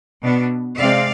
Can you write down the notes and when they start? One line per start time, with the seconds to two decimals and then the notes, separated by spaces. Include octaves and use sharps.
0.23 B2 B3 D4
0.79 C3 G#3 C4 D5 F5